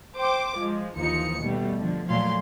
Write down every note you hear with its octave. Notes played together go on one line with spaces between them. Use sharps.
C5 G5 D6
F3 G#3
D#2 E3 F3 D#4 C#7
B2 G3 A3
D3 F3
A#2 F3 F#3 A3 F5 C6